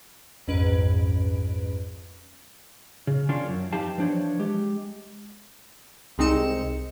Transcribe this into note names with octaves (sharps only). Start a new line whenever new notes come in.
A#1 F2 G#2 C#4 B4 D7
C#3
D#3 C#4 D4 F4
F#2
F2 E3 D#4 G4 F5 A5
E3 F3 D4 C5 C#5
G#3 G4
C2 G#3 C4 D#4 C#7 E7